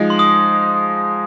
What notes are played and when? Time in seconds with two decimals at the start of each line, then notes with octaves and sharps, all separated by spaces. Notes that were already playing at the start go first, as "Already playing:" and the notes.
Already playing: F3 G#3 D#4
0.10 C6
0.19 D#6